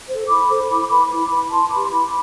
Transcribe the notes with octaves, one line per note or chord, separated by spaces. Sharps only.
A4 C5
E4 B5 D6
A4 C5
E4 B5 D6
B4 B5 D6
E4 B5 D6
B4
E4 A5 C6
G4 B4 B5 D6
C6
E4 B5 D6